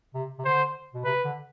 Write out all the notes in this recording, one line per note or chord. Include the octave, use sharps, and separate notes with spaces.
C3
C3
D3 C5
B2
C3 B4
D3